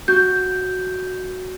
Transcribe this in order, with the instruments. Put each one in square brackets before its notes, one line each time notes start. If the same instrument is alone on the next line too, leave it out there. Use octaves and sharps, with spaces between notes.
[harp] F#4 [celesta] G6